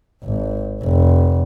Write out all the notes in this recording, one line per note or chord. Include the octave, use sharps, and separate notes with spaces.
G#1
F1